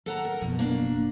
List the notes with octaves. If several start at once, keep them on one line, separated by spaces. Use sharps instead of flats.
D#3 A4 F#5 A#5
A#4
F#1 B2 F3
A#3 D4